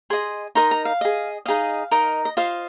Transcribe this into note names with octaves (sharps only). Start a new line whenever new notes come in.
G#4 D#5 C6
D#4 A#4 D#5 C6
A#5
F5
G#4 D#5
D#4 G#4 D#5 F5
D#4 A#4 D#5
D#5
F4 C5 D#5 F5